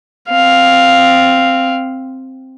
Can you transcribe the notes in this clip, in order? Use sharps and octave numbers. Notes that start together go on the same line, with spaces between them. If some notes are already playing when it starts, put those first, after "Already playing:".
C4 F5